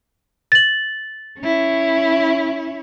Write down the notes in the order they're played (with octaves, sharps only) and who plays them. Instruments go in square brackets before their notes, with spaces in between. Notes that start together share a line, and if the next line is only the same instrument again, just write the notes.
[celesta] A6 F#7
[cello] C#4 E4